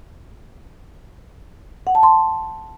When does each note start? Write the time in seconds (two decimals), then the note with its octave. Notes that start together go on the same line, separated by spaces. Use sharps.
1.87 F#5
1.95 A5
2.03 C6